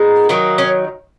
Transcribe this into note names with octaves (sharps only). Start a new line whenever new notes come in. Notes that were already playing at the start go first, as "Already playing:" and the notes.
Already playing: A#2 G#3 B3 D#4
D#3 F#3 A#3
C#4